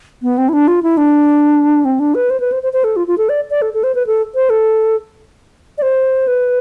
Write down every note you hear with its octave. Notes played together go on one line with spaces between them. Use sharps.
B3
C4
E4
D4
F4
E4
D4
C4
D4
B4
C5
B4
C5
C5
C5
A4
F4
F4
A4
D5
D5
A4
A4
C5
B4
A4
C5
A4
D5
C5
B4